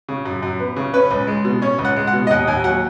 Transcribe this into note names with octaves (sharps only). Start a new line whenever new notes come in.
C#3
F#2
F#2
B3
C#3
C#4 B4
C#2
G#3
B2
C#4 C#5
C#2
F#5
G#3
F#5
B2
D#5
D#2 F#5
D#2 G#5
F#3 F#5